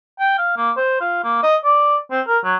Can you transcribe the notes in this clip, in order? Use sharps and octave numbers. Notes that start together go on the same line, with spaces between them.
G5
F5
A#3
C5
F4
A#3
D#5
D5
C4
A#4
F#3